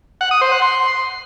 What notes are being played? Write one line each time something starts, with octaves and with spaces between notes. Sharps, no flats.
F#5
D#6
C5
F#5
C6